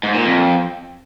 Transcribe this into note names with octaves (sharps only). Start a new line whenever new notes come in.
G#2
A#2
F2